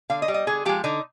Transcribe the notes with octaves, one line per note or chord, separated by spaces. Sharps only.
D3 F5
D#5
G3
D#5
D3 G#4
F3 G#3 G4
D3 D#4